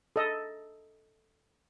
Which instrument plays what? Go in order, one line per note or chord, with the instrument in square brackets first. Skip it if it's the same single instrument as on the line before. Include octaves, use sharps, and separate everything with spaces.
[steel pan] A4 D#5